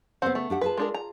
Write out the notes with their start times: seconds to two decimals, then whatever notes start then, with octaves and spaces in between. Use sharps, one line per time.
0.22 C#3 B3 C4 C5 F#5
0.35 A3
0.50 D4 G4 F#5
0.61 F4 G#4 B4 A5
0.77 G#3 D4 A#4
0.94 A#5